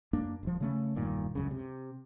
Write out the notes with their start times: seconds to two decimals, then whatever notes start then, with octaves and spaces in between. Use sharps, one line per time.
0.13 F#2 A#3 D4
0.43 D#1 F3
0.61 C#3 A3 C#4
0.95 E1 G2 A#2 D#3
1.35 C#2 F#2 C#3
1.51 C3